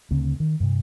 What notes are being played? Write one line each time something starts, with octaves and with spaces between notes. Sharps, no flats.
D2 C#3 C4
D#3
G2 C3